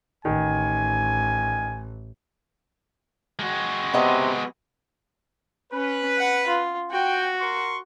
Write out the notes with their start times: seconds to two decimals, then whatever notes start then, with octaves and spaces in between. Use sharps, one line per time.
0.25 A1 D#3 G#5
3.39 G#3 F#4
3.94 C3 B3 D#5
5.72 C#4 B4
6.18 F#5
6.47 F4
6.91 F#4 G5
7.41 A#4 C6 C#6